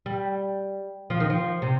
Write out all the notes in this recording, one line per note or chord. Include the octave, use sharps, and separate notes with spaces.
G3
F3
D#3
F3
C3